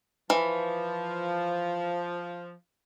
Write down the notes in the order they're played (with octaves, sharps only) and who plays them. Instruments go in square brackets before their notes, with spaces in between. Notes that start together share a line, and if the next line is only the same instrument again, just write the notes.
[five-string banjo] E3 [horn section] F3